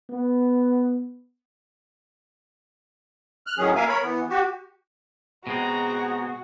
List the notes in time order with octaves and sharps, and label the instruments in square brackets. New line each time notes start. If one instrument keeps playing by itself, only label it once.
[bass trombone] B3
[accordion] F6 F#6
A2 D#3 F#3 C#4 G#4
A#3 A#4 E5 F5 G#5
A#4 C#5 B5
E3 B3
F#4 G4
[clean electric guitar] B2 G#3 C4 [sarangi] F#4 [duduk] G#4 [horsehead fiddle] A#5